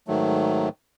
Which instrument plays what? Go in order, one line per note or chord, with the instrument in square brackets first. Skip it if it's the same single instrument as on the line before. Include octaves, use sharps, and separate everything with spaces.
[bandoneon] G#2 D#3 F#3 A3